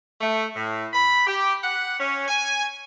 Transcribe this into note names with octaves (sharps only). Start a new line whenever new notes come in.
A3
A2
B5
G4
F#5
C#4
G#5